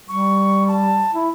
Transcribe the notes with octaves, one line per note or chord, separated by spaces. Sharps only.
G3 C#6
A5
E4